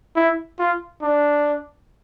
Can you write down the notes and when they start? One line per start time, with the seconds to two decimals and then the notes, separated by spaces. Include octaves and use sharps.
0.16 E4
0.59 F4
1.02 D4